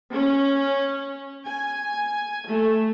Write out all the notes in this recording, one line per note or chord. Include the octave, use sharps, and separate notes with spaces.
C#4
G#5
A3